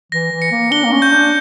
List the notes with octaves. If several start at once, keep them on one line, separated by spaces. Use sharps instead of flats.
E3 A#6
E3
C#7
A#3
D4 G7
A#3
C#4
G6
D4